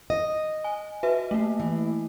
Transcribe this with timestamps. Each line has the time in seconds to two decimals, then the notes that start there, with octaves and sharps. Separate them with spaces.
0.10 D#5
0.64 G#5
1.03 F#4 B4 E5
1.31 A3 A#3
1.60 E3